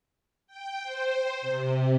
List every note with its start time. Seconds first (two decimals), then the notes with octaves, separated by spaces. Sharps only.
0.47 G5
0.83 C5
1.41 C3